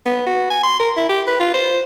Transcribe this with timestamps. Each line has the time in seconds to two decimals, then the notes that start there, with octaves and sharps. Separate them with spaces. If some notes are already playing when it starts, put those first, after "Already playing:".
0.06 B3
0.27 F#4
0.50 G#5
0.63 C6
0.80 A#4
0.97 E4
1.09 G4
1.27 B4
1.40 F4
1.54 C5